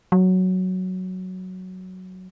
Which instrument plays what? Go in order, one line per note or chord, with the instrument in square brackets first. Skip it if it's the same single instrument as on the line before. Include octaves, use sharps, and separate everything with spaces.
[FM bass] F#3